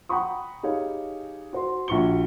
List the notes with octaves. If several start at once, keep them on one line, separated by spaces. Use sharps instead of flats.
F#5 G5 A#5 B5 C#6 D#6
D#4 G4 G#4 C#5 F5
F#4 C5 C6
A#1 F#4 C#6 C#7 G7